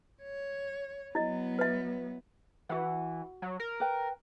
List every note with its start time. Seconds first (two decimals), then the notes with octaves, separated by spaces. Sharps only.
0.23 C#5
1.15 F#3 B3 E4 D#5
1.59 B4 E5
2.69 E3 F#4 F#5
3.42 F#3
3.60 A#4
3.80 B4 G5